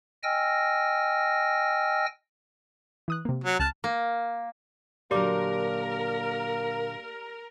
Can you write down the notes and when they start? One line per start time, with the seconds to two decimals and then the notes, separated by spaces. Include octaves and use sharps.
0.23 D#5 G5 G#5 E6 F6 A#6
3.08 E3 D#6 F#6
3.25 C3 A#3
3.44 F#3
3.59 C#2 A5 F6 F#6
3.84 A#3
5.11 A#2 D3 F#3 A#3 G4 A#4 D5 D6